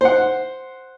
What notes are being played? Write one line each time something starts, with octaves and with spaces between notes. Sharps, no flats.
C5 F#5